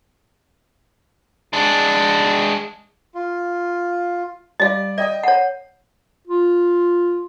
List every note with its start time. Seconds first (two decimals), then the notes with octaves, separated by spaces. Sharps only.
1.53 G#3 D4
3.15 F4
4.60 G3 D5 D#5 F5
4.98 D5 D#5 G5 D#6
5.23 C#5 F#5
6.27 F4